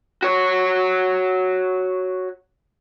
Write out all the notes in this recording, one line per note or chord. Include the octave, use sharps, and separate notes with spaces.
F#4 C#5